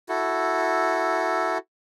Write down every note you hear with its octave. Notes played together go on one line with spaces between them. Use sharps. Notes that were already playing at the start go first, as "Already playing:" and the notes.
E4 F#4 A4